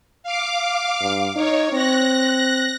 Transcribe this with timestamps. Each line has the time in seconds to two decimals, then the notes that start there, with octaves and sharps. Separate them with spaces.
0.23 F5 D6
1.01 G2
1.36 D#4 C#5
1.72 C4 F#6 A#6